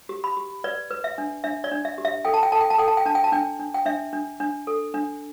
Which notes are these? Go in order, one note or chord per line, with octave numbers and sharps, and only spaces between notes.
G4
B5
G4
B4 D5
B4
E5
D4
D4 E5
D5
D4
E5
G4
E5
A4 G5
A5
G5
A4 A5
G5
A5
A4 G5
A5
G5
D4 A5
G5
A5
D4 G5
D4
G5
D4 E5
D4
D4
A4
D4